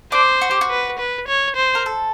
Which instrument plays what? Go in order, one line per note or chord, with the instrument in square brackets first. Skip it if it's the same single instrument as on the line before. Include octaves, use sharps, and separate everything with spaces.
[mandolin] D4 [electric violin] C5
[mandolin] F#4
G4
F#4
[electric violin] B4
B4
C#5
C5
[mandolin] A#4
A4